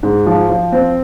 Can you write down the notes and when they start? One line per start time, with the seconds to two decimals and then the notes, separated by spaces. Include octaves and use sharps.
0.03 G#2
0.26 F3
0.50 F3
0.72 C4